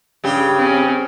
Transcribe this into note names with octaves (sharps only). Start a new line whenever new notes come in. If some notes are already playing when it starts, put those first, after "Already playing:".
G2 C#3 G4
C4 C#4